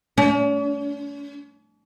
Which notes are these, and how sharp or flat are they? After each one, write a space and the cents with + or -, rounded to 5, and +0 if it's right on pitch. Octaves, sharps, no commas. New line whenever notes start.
C#4 +45